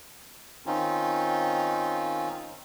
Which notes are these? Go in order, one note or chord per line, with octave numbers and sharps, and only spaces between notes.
D#3 C4 C#4 D#4 F4